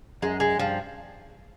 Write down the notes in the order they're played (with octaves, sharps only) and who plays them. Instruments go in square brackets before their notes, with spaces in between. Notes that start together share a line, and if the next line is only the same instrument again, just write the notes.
[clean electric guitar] F#2 [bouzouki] G#3
[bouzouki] G#3
[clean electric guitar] G2 [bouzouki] F3